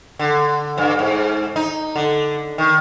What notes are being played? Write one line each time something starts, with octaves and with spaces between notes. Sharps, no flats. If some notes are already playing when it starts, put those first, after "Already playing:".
D3
G2
G#2
D#4
D3
D#3